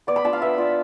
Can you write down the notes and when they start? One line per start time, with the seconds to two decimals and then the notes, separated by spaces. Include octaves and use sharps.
0.07 B3 D5
0.16 B5
0.24 D4 F4 A5
0.33 F5
0.41 B3 E5
0.58 D4 F4